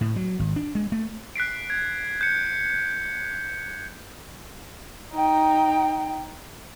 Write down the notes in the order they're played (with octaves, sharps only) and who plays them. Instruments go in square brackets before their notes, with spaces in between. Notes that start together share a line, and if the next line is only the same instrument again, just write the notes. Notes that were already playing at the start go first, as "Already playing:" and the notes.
[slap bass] A2
F#3
G#1
D4
G#3
A3
[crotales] F#6 B6 C7 D7
G#6
G6 C#7
[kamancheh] D#4 G5